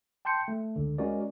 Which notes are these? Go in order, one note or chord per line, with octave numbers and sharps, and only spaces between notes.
G5 A5 C6 G6 C#7
A3
C#2 D3
G#3 C#4 F#4 A#4 D5